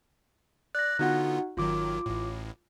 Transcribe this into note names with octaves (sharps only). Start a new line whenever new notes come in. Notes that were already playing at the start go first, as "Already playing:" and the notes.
D5 F#6 A#6
D3 B3 D#4 F4 F#4 F#5
G#1 D#3 F#3 F4 D6
A1 A2